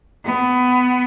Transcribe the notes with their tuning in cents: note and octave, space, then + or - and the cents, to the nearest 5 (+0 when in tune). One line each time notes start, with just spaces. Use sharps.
B3 +20